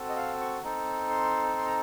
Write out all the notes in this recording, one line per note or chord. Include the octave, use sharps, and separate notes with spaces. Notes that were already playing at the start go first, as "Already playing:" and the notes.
Already playing: C4 F#4 A4
D#5
F5
C#6
C4 D#4 A4
C6
C6
A#5